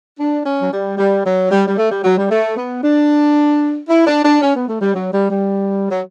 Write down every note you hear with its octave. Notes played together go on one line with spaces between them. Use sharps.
D4
C#4
F#3
G3
G3
F#3
G3
G3
A3
G3
F#3
G3
A3
B3
D4
E4
D4
D4
C#4
B3
A3
G3
F#3
G3
G3
F#3